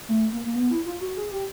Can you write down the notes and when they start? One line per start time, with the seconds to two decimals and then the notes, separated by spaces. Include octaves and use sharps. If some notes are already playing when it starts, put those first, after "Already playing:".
0.09 A3
0.32 A#3
0.45 A#3
0.55 B3
0.71 E4
0.86 F4
1.01 F#4
1.17 G#4
1.31 G4